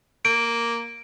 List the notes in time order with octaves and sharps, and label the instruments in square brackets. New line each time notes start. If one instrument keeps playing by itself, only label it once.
[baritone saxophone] A#3 [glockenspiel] D7